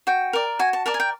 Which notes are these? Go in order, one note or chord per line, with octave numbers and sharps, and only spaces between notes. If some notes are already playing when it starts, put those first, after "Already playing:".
F#4 G5
A#4 D5
F#4 G#5
A5
A#4 D5 A5
G#5
G5